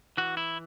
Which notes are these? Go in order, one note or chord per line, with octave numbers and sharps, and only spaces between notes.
E3 F#4
E4